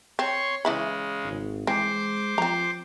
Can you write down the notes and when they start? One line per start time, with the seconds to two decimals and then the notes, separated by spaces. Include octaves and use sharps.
0.19 C4 C#5 C6 C#6
0.65 C#3 E3 G#3 E4 B5
1.24 G#1
1.67 E3 G#3 C4 C5 C6 D6
2.38 F3 C4 A#5